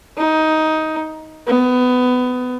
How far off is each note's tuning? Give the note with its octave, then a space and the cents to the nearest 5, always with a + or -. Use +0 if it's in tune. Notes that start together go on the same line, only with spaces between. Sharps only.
D#4 +15
B3 +20